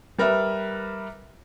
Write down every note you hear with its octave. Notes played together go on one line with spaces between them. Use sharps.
G3 A#4 B4 E5